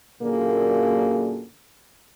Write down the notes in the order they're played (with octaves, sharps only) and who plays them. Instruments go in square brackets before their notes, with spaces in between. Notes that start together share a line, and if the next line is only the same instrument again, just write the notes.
[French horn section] F#2 A#2 D3 A#3 G#4